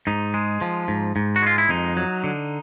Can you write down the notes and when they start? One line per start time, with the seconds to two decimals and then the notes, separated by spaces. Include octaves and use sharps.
0.07 G#2 D#4
0.34 G#3
0.61 F3
0.88 G#2
1.16 G#2
1.36 F#4
1.42 G#3 F4
1.58 E4
1.69 F2 D#4
1.97 F#3
2.24 D3